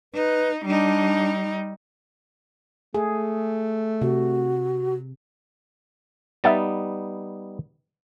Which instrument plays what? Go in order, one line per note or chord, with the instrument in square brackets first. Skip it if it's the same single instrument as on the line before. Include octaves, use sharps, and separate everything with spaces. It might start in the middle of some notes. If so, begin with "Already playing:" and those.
[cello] D#4 [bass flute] B4
[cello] G3 D#4 [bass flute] D4
[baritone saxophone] A3 [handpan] G#4
[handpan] C3 [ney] F#4
[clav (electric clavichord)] G3 B3 D#4 [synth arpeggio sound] E5 F#5 A6